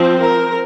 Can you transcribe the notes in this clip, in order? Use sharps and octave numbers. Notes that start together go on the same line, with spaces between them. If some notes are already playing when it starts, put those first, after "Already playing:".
Already playing: F3 C4
A#4